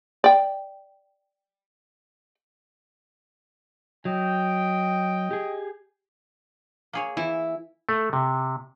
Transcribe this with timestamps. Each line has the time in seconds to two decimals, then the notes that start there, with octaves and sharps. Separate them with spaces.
0.24 D5 G5
4.05 F#3 D#5 G5
5.31 G4 G#4
6.93 A#3 G#4 C#5
7.17 E3 E4
7.89 A3
8.13 C3